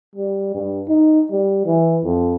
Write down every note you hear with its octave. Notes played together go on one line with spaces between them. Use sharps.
G3
G2
D#4
G3
E3
F2